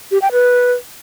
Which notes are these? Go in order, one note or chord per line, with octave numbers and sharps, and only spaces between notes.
G4
G5
B4